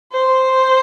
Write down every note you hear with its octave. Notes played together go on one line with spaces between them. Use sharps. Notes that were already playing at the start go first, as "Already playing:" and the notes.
C5